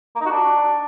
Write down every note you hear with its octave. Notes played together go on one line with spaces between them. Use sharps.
A#3
D#4
F#4
D4